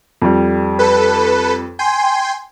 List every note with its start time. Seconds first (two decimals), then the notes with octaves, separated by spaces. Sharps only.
0.22 F2 G3
0.79 A4 B4
1.79 G5 G#5 C6